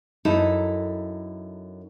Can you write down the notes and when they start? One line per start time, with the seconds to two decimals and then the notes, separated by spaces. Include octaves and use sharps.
0.25 F#2 D#4 E4 A4